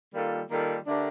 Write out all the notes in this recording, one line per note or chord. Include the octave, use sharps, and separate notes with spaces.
D#3 G3 A#3 F4 A4
D#3 G3 A#3 F4 A4
D3 A3 D4 G4 A#4